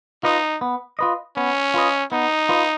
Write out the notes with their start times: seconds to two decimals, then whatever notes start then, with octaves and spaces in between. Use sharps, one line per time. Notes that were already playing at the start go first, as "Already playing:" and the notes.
0.23 D#4 F4 B4 D#5
0.61 B3
0.99 F4 B4 D#5
1.36 B3 C#4
1.74 F4 B4 D#5
2.12 B3 D#4
2.49 F4 B4 D#5